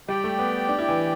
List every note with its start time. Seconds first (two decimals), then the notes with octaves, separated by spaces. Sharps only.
0.09 G3 G4 D5 G5
0.24 A3
0.39 B3
0.68 D4
0.79 E4
0.89 E3